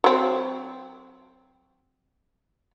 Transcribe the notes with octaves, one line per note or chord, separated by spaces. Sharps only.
F#3 C4